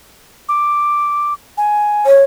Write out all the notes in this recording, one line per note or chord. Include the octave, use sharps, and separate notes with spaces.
D6
G#5
C#5